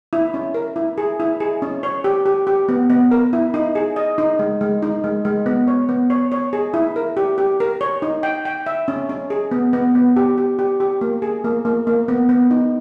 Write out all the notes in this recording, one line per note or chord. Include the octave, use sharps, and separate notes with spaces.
E4
C#4
A#4
E4
G#4
E4
G#4
C#4
C#5
G4
G4
G4
B3
B3
A#4
E4
D#4
G#4
D#5
D#4
G#3
G#3
D#4
G#3
G#3
B3
C#5
B3
C#5
C#5
G#4
E4
A#4
G4
G4
A#4
C#5
D#4
G5
G5
E5
C#4
C#4
G#4
B3
B3
B3
G4
G4
G4
G4
A#3
G#4
A#3
A#3
A#3
B3
B3
D#4